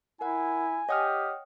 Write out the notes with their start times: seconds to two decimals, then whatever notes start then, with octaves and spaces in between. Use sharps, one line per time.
0.21 E4 A#4 F#5 G#5
0.89 G4 C#5 D#5 F#5 G5 D#6 F6